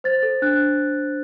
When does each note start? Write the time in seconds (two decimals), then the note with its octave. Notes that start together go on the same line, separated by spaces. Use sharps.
0.04 C5 A6
0.23 A4
0.42 D4 F#6